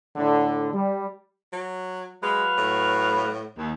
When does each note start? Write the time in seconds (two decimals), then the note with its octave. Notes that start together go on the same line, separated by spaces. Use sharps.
0.16 A2 D3
0.73 G3
1.53 F#3
2.23 F#3 G#3 B4 F5
2.58 A2
3.56 D#2